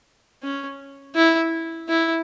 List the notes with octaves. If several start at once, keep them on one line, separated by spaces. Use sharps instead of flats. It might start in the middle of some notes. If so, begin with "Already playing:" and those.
C#4
E4
E4